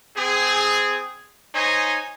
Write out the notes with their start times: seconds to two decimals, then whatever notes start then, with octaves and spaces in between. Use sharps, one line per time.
0.17 C4 G#4
1.55 D#4 C5 C#5 D#5 G#5